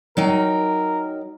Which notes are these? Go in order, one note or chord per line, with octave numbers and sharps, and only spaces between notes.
F#3 D#4 A#4 G5